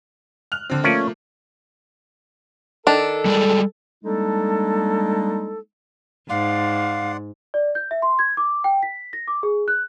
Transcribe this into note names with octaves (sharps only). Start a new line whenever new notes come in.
F6 F#6 F7
D3 C4
F3 A3 A#3 C#4 D5
D#3 D4 A4
G3 G#3 D5
G3 G#3 A#3 D4 D#4 A4
G#2 D5 F5 F#5 C6
D5
G6
E5
C6
G#6
D6
G5
B6
A#6
D6
G#4
F#6